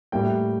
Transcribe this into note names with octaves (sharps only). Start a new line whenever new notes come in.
A2 G3 A#3 G5